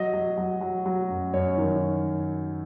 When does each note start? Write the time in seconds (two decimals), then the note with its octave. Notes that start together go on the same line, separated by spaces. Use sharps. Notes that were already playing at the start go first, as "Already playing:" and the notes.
Already playing: F#3 D#5
0.14 F#3
0.37 F#3
0.61 F#3
0.86 F#3
1.09 F#2
1.34 F#2 C#5
1.57 D#3